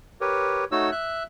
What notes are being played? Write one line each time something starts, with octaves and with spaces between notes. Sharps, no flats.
G4 A#4 B4 C#5
A3 D#4 F#4 C#5 E6
E5 F#6